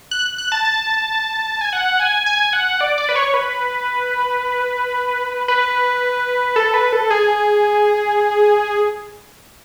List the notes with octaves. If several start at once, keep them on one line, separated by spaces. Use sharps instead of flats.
F#6
F#6
A5
A5
G#5
F#5
G#5
G#5
F#5
D5
D5
B4
C#5
B4
B4
A4
B4
A4
G#4